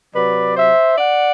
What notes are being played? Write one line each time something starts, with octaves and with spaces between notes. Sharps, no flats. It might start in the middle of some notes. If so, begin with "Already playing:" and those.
C3 F#3 B4 D5
C5 E5
D5 F#5